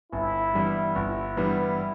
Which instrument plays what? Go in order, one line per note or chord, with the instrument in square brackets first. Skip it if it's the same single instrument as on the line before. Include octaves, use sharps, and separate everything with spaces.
[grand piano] G1 [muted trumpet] E4
[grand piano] G2 E3 G3 B3
[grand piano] G1 [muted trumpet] E4
[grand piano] G2 E3 G3 B3